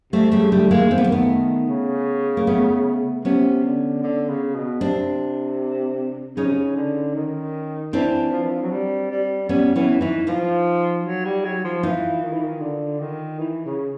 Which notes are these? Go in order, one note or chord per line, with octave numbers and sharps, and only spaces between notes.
C3 G3 A3
C#3 G3 A3
D3 G3 A3
D#3 G#3 A#3
C4
B3
A#3
A3 B3
C#3
A#3
A3 B3
C3 B3 C#4
D3
D3
C#3
B2
C3 C4 D4
C#3 C#4 D#4
C3
C#3
D3
D#3
E3 C4 D4
F3
E3
F3
F#3
G3
G3
G3 B3 C#4
E3 B3 C#4
E3 C#4 D#4
F3 D#4 F4
F#3
G3
F#3
F3
E3 D#4 F4
D#3
E3
D#3
D3
D#3
E3
C#3